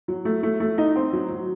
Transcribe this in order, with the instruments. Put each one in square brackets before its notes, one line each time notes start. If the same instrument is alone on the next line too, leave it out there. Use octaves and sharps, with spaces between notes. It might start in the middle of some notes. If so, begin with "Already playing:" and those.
[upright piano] F#3
A3
A3
A3
D#4
C4
F#3
F#3